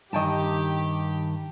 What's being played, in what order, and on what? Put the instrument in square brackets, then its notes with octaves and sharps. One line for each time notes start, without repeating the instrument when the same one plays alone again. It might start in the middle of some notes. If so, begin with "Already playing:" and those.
[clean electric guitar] G2 D#3 [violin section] G4 [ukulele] D#5 G5 A5